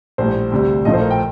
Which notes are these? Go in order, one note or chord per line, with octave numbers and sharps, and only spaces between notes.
A#1 A2 G3 C5
D2 C3 G3
A#1 A2 F3 A3 D#5
C5
A#4
G5